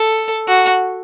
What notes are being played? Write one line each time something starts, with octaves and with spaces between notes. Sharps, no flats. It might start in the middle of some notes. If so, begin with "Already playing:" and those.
Already playing: A4
F#4